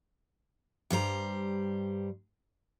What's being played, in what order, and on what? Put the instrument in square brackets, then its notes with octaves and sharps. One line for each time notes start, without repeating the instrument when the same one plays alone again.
[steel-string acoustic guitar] G2 G3 C5 A#5